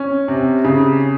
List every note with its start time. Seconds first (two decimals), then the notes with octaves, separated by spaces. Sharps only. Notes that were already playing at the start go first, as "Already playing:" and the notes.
Already playing: C#4
0.28 C3
0.65 C#3